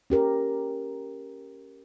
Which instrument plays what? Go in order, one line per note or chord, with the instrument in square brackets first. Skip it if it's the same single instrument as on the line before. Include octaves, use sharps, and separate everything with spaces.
[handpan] C#4 G4 A#4